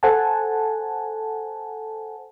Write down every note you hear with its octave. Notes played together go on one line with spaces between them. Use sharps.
A4 C5 F#5 G#5 A5